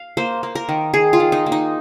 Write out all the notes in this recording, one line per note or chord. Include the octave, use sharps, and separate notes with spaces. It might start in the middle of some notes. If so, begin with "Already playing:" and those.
Already playing: F5
A#3 C5
A#3
A#4
D#3
D#3 G#4
F4
D#3
D#4
A#3
D#4